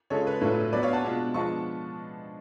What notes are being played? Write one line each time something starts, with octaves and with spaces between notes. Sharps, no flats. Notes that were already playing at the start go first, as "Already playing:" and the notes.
C#3 G#3 C#4 F4 A4 C#5
B4
A2 F#3 A3 D4 F4 B4
F#3 B3 D4 B4 D5
C#5 F5
F#5 A5
B2 G#3 D4 F4
F3 G#3 B3 D4 F4 A5 C#6